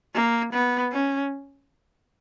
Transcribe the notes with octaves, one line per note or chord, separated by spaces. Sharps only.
A#3
B3
C#4